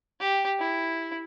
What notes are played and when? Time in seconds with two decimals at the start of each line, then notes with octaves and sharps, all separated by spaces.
0.20 G4
0.59 E4